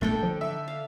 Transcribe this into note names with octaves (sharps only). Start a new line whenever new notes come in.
A#1 A3 A#3 D4 A4 G5
D3 F3
E5
F5